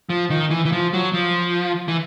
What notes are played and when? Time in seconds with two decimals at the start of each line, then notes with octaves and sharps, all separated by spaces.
0.09 F3
0.30 D#3
0.50 E3
0.65 E3
0.72 F3
0.93 F#3
1.13 F3
1.88 E3